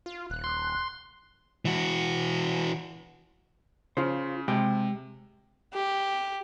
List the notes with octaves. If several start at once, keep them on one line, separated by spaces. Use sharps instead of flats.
F4
D#1 F#6
C6
E3 F#4
C#3 F4 C5
C3 G#3 G5
G4